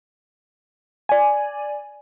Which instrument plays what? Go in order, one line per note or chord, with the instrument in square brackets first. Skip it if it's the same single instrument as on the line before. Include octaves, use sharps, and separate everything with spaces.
[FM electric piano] D5 G#5